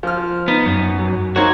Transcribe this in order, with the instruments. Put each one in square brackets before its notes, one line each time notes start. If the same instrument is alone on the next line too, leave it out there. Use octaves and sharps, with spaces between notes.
[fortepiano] F3 F6
[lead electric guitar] B3 [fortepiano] D#4
[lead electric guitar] F#2
[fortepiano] F#3
[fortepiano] A#3 C4 D#4 [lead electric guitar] F#4 C#5